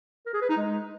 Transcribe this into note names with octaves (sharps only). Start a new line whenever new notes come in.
A#4
G#4
B4
D#4
G#3